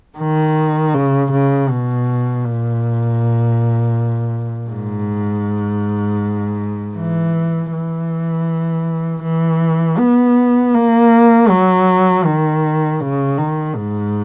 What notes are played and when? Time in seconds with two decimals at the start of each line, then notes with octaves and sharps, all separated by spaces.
0.18 D#3
0.94 C#3
1.32 C#3
1.70 B2
2.44 A#2
4.71 G#2
6.97 E3
7.72 E3
9.23 E3
9.98 B3
10.74 A#3
11.50 F#3
12.25 D#3
13.00 C#3
13.38 D#3
13.75 G#2